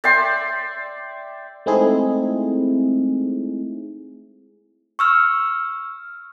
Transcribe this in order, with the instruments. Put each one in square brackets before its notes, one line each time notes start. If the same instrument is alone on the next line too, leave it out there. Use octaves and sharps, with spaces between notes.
[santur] D5 E5 G5 C6
[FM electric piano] G#3 A3 C4 D#4 E4 G#4
[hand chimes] C#6 E6 F6